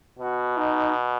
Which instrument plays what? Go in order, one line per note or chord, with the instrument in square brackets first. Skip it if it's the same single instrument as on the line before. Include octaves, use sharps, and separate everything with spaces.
[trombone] B2 [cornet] F#4
[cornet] D#4